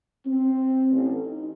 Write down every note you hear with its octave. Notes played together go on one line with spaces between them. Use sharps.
C4
A1
D#4